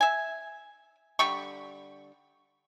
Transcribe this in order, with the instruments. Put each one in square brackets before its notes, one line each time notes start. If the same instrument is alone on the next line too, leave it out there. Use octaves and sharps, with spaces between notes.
[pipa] E5 G#5
D3 G3 B5 C#6